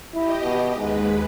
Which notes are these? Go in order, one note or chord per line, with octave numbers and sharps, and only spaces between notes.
E4 G4 D#5
B2
D#2 G#2 G#3 B4